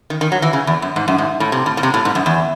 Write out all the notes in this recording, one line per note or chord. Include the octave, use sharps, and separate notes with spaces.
D#3
D#3
F#3
E3
C#3
E2
F#2
G#2
F#2
G#2
A2
C3
A2
A2
C3
A2
G#2
F#2
E2